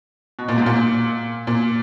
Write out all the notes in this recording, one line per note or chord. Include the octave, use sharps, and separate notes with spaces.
B2
A#2
G#2
A#2
A#2